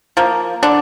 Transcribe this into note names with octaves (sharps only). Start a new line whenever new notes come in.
F3 A#3
D3 D4